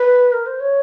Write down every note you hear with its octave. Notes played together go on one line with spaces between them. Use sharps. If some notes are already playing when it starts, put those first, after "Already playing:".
Already playing: B4
A#4
C5
C#5